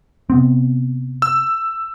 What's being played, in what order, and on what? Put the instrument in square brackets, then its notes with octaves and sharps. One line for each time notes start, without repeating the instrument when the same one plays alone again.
[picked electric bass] C3 B3 C4
[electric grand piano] E6